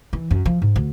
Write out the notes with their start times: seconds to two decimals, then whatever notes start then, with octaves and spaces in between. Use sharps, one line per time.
0.13 E3
0.31 F#2
0.45 F3
0.62 G#2
0.76 D2